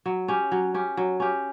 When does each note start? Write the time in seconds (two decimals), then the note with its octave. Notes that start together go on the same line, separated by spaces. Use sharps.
0.06 F#3
0.28 C#4 G4
0.52 F#3
0.74 C#4 G4
0.97 F#3
1.20 C#4 G4